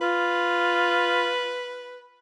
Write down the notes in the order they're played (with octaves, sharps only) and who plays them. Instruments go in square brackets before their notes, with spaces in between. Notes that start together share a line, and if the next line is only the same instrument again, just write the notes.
[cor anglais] F4 [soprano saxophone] B4